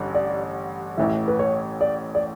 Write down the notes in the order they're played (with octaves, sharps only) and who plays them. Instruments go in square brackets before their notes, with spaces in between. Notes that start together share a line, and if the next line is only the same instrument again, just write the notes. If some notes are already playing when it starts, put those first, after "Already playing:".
Already playing: [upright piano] A1 G2 D3
[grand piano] D5
[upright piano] A1 A2 E3 [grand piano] E5
[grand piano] B4
C#5
D5
D5